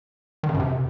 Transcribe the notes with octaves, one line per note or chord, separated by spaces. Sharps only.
D#3
C#3
F#2
C3